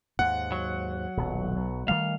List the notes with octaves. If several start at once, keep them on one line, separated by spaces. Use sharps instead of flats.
D#2 G#2 F#5
F#3
D#1 B1
B1
D#3 G3 A3 F5